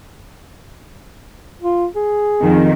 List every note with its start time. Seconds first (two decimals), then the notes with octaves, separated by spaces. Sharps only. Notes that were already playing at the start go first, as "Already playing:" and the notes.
1.61 F4
1.96 G#4
2.42 F2 D#3